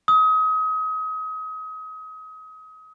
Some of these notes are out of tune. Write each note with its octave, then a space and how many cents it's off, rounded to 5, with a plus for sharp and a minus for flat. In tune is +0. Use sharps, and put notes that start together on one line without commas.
D#6 +30